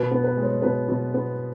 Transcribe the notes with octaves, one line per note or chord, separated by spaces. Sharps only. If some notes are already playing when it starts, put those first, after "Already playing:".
Already playing: B2 B4
B3
B4
G#3
C#5
B2 B4
B2
B3